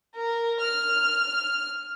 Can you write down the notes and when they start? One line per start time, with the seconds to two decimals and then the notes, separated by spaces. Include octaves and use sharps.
0.15 A#4
0.60 F6